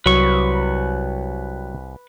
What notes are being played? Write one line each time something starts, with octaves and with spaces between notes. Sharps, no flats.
C2 F#3 B4 C#6